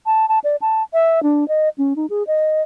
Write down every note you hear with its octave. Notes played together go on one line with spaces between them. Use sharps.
A5
A5
D5
A5
E5
D4
D#5
C#4
D#4
G#4
D#5